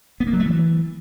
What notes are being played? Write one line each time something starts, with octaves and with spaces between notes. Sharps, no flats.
B3
A#3
F#3
A3
E3